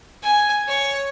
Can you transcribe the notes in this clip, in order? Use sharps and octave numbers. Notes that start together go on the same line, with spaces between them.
G#5
C#5